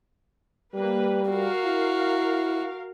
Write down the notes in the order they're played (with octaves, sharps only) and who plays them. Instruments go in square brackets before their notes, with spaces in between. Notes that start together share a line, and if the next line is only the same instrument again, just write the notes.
[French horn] G3 [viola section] A#3 B4
[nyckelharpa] F#4 [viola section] A#4 F5
[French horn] E4